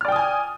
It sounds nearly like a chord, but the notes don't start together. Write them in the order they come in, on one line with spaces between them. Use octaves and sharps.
F6 D5 G5 D#6 G#5